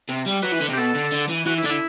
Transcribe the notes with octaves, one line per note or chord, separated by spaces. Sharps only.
C3
G3
F#3 B4
E3
D3
C3
G4
B2 A4
D3
D3
E3
E3 F#4
E4
D3 D4
E4